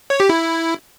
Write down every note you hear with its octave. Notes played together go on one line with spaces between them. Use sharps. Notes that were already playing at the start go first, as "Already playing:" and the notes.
C#5
G4
E4